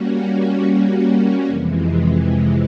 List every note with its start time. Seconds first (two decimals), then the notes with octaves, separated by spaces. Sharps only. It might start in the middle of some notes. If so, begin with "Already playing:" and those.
Already playing: G3 A#3 C#4 F#4
1.46 F2 C3 E3 G#3